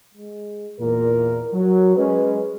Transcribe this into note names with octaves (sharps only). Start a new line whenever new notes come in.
G#3
E2 A#2 A#4
F#3 A#4
G#3 C#4 B4